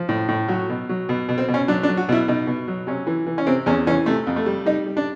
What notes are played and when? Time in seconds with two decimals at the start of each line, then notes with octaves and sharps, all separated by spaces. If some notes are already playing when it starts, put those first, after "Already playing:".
Already playing: F3
0.09 A2
0.29 A2
0.48 F#3 F#4
0.69 B2
0.89 F#3
1.09 B2
1.29 B2
1.38 C4
1.48 B2
1.54 C#4
1.68 F#3 D4
1.83 D4
1.88 F#3
1.97 F#4
2.09 B2 E4
2.28 B2 D#4
2.47 B2
2.68 F#3
2.87 C3 C#4
3.07 E3
3.27 E3
3.38 C#4
3.47 C3 C4
3.66 E2 C#4
3.87 E3 C#4
4.06 C3 A3
4.27 F2
4.36 A3
4.46 G3
4.66 G3 D#4
4.86 G3
4.97 D4